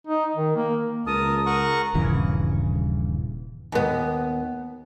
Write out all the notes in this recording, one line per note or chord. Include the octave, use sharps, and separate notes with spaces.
D#4
D#3
A#3
C#2 A#4 A5 D#6
A#4 F#5 C#6
D#1 G2 C#3 E3
D#2 B3